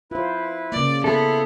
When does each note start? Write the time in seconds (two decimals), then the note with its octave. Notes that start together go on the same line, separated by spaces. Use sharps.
0.11 E4 F4 B4 C5
0.72 C#3 A#3 D5
1.04 B3 E4 A4 E5 C6